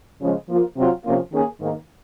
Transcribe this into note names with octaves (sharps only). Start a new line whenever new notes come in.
C#3 F3 G#3
F3 A#3 F4
C3 F#3 C4 F4
C3 F3 A#3 C#4 F4
D#3 A#3 C#4 G#4
G#2 D#3 A#3